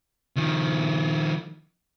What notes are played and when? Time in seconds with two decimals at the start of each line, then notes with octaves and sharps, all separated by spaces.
0.36 D#3 F3